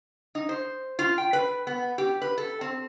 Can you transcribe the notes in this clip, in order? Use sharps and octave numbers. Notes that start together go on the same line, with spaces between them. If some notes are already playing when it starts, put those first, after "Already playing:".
D#4
C5
F4
G5
B4
B3
G4
B4
A4
C4